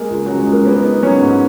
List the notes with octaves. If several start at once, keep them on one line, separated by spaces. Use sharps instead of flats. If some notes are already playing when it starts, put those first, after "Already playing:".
Already playing: G#3 A#3
C#2
C#3 F#3
G#3
C#2
A#3
A#3 B3
D#4
F#3 C#4
G#2